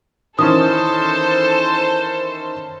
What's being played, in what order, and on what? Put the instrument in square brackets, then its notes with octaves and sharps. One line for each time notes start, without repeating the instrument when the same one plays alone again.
[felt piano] D#3 E3 C#4 [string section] A4 C5 A5 [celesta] D#6